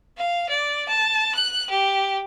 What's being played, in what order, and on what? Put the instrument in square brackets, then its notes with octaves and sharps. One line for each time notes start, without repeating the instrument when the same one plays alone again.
[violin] F5
D5
A5
F#6
G4